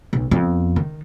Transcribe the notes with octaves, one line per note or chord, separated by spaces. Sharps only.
B1
F2 B3
D#3